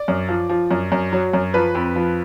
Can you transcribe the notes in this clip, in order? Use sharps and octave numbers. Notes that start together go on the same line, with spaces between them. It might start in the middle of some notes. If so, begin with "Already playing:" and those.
Already playing: D5
F#2
F3
F3
F#2
F#2
F#3
F#2
F3 B4
F2
F3